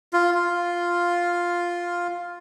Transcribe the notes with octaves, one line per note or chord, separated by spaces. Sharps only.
F4
F4